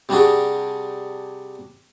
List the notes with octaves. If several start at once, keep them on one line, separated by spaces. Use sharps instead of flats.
C3 G3 D4 F#4 G#4